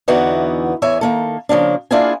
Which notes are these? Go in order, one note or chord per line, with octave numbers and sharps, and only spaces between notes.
E2 D3 E3 B3 D#4 F#4
E2 C#5 E5 G#5
D#3 A#3 A4
C#3 F3 A#3 D4
A#3 D4 E4 F4 G#4 G#5